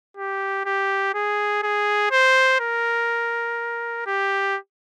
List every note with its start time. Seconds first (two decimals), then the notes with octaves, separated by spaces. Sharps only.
0.17 G4
0.66 G4
1.14 G#4
1.63 G#4
2.11 C5
2.60 A#4
4.07 G4